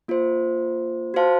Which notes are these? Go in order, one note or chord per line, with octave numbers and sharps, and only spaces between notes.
A#3 F4 C5
F#4 C5 F5 A5